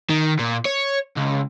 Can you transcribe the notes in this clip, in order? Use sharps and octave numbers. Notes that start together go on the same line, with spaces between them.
D#3
A#2
C#5
C#2